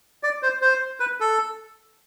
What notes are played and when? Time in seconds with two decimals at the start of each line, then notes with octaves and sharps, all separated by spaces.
0.23 D5
0.43 C5
0.62 C5
1.00 B4
1.20 A4